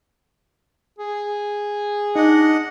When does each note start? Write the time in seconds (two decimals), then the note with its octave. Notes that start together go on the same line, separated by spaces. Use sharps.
0.99 G#4
2.16 D4 D#4 D#5 F#5